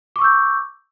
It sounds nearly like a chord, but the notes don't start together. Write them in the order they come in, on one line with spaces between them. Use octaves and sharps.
D6 C#6 E6 G6